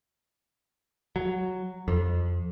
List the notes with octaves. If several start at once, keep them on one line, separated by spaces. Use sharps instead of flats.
F#3
F2